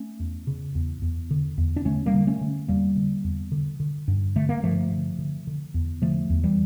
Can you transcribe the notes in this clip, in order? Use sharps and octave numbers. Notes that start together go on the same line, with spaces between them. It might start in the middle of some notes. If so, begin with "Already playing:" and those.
Already playing: A3 C#4
E2
C#3
E2
E2
D3
E2
D4
D3 A3 C#4
G3 A#3
D3
A3 C#4
D3
E2 G3 A#3
D3
E2
D3
D3
G2
D3 A3
A#3
G2 F3 A3
D3
D3
D3
E2
D3 F3 A3
E2
E3 G3